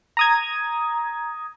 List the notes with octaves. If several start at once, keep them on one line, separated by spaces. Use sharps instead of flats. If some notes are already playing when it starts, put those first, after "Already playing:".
A#5 D#6 G#6